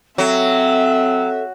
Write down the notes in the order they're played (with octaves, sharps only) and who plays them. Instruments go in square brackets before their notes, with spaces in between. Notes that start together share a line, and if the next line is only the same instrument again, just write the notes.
[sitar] F#3 [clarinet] C4 [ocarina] A4 [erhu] E5